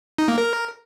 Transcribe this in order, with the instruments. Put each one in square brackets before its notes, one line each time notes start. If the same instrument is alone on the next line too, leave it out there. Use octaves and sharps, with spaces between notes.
[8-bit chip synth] D#4
A#3
A#4